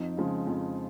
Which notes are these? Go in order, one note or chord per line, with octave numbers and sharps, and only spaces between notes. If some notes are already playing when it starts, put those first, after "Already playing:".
Already playing: F2 D#4
C#3 F3 G#3
F2